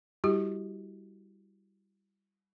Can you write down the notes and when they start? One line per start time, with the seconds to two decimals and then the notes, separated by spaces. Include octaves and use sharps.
0.24 G3 E4 F#4 G4